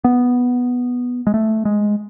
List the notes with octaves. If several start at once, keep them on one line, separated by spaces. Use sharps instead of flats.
B3
G#3
A3
G#3